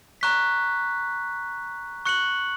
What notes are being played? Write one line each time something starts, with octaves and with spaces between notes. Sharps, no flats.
A#5 C#6 F#6 B6
C#6 F#6 C#7 F#7